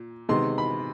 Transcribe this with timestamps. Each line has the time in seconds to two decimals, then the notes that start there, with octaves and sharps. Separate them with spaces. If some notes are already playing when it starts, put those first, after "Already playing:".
Already playing: A#2
0.29 C3 D#3 G#3 B3 C6
0.58 B5